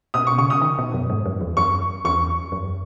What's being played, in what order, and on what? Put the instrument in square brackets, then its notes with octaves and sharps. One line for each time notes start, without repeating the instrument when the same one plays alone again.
[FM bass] B2 [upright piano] D#6
[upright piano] C#6
[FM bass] C#3 [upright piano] C#6
[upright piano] D#6
[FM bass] D#3
B2
F#2
G#2
F#2
E2
[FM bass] F#2 [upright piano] C#6
[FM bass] E2 [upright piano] C#6
[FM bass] F#2